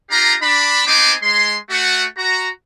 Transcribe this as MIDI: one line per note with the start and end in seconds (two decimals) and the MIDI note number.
0.11 0.34 62
0.11 0.34 65
0.11 0.34 67
0.11 0.34 77
0.11 0.34 82
0.42 0.84 62
0.42 0.84 83
0.86 1.13 59
0.86 1.13 60
0.86 1.13 63
0.86 1.13 72
0.86 1.13 80
0.86 1.13 86
1.22 1.56 56
1.22 1.56 84
1.70 2.03 57
1.70 2.03 66
1.70 2.03 78
2.17 2.48 66
2.17 2.48 82